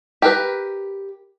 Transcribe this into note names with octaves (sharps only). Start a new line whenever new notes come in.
G4 A#4 B4